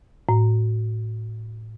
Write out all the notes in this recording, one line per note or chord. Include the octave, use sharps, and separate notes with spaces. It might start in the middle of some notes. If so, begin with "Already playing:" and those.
A2